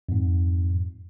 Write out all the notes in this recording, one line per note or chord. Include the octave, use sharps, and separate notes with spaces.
F2 G#2